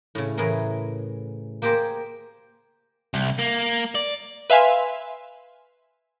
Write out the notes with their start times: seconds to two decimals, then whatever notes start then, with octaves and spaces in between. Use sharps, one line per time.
0.15 A2 C#3
0.37 A2 E3 G#4 A#4
1.62 A#3 G4 G#4 A#4 C5
3.14 C2
3.39 A#3
3.95 D5
4.50 B4 E5 F5 G#5 C6